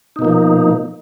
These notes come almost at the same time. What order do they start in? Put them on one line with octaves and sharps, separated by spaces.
D#4 B2 A#3 F3